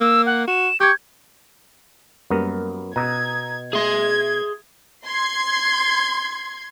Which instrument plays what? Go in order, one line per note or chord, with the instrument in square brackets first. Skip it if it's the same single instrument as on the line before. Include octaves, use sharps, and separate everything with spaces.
[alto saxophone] A#3 [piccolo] E6
[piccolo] F#5
[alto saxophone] F#4 [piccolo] E7
[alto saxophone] G4 [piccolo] C#6 [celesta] G6 G#6
[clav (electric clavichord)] F#2 B3 A#4 [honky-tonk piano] G3 A#3
[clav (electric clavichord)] B2 [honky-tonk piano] A#5 D#6 E6 [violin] G#6
[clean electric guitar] G#4 C6 [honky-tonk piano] E5 [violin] G#6
[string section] C6 G#6